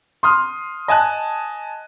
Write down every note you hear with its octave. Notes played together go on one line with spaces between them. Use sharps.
C6 D#6 F6
D#5 G#5 A5 F#6